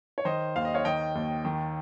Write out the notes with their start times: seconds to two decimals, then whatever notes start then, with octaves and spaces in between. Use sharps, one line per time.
0.18 C#5
0.25 D#3 C5 D#5
0.55 D#2 F5
0.65 D#5
0.74 C#5 F5
0.85 D#3 D#5 G5
1.15 D#2
1.45 D#3